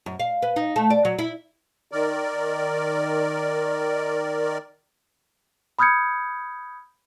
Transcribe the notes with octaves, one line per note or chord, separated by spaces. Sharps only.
F#2
F5
B4
D#4
A3
D5
F#3
E4
D#3 A#4 D5
B5 D#6 F6 G6 G#6 C#7